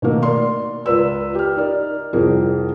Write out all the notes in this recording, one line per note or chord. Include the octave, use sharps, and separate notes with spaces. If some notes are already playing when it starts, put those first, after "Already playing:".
B2 D#3 A3 A#3
A#4 D5 C6
C#2 F4 A#4 B4 D5 E6
G4 F6
D#4 A#4 D5
C2 F2 C4 G#4 A#4